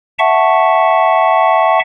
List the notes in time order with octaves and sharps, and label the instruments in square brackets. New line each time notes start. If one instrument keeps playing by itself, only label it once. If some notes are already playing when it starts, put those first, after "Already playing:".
[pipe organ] E5 F#5 A5 C#6